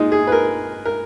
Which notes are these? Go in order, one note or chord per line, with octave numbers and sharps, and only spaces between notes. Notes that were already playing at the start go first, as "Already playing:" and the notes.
Already playing: A#2 G#3 D#4
G#4
B4
A#4
A#4